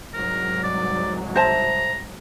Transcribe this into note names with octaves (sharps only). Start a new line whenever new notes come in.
C2 G#2 F#3 A#4
D5
C5 E5 A5 A#5